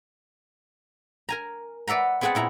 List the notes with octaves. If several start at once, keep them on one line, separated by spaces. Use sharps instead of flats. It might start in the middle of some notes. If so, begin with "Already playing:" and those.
A#4 G#5 A#5
B4 D5 E5 F#5 A#5
B3 C4 G#4 B4 F#5 A5
A#2 E4 A#5